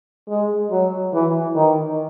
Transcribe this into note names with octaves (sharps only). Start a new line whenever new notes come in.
G#3
F#3
E3
D#3